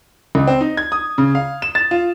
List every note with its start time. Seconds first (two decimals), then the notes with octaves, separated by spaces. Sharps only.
0.35 C#2
0.47 C4
0.61 D#4
0.77 G#6
0.92 D#6
1.18 C#3
1.35 F5
1.62 E7
1.75 A6
1.91 F4